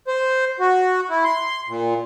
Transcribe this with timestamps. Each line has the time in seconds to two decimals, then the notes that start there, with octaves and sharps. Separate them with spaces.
0.08 C5
0.60 F#4
1.10 E4
1.24 C6
1.69 A#2